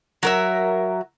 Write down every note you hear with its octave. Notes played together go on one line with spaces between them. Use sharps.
F#3 A#4 E5